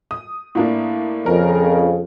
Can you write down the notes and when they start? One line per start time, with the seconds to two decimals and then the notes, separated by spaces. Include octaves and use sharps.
0.11 D#6
0.55 A2 A#3 D4
1.26 F2 C#3 F3 A#4